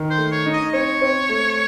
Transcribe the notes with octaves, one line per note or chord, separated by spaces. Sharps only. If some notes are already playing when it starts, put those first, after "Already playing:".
Already playing: D#3
C5
A3
C#5
D#4
D#5
C4 C#5
C4
A3